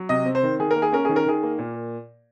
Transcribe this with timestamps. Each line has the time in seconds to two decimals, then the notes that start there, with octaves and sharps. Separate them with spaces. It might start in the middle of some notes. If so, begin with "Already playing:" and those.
Already playing: F#3
0.09 C3 D#5
0.25 C4
0.35 C5
0.43 D#3
0.60 D#3 G#4
0.71 A#3 A#4
0.82 G#4
0.92 C#4 A#4
1.05 D#3 G#4
1.16 A#4
1.26 D#3 G#4
1.43 A#3
1.59 A#2